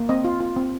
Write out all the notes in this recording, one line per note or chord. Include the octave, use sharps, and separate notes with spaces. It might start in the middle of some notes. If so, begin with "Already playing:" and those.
Already playing: A#3
C4 D#5
F4
F4
C4